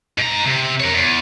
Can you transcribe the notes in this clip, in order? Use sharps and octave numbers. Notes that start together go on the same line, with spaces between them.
G#2 A#5
C3
A#4 C#5
E2